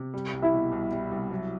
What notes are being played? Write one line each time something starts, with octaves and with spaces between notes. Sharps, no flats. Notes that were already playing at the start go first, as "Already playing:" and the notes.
Already playing: C3
G3
C2
E4 E5
B2
C2
G3
C2
F#3